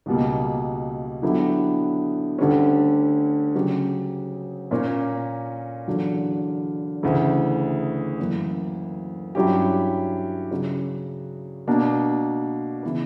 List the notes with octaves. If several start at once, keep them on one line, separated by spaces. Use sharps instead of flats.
C#2 B2 G3 A#3
D3 F#3 B3 E4 G4
D2 D3 G3 C#4
C#3 F#3 C#4 G4
A#2 A#3 C#4
E2 D3 F#3
D2 C#3 E3
F#2 E3 A#3
G2 F#3 C#4 E4 G4
C#3 F#3 C#4
B2 A#3 D4
C#3 E3 B3